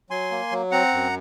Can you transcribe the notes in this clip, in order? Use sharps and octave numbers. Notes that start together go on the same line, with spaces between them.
F#3 G#5 C6
A#3
F#3
C4 F#5 A#5
F#2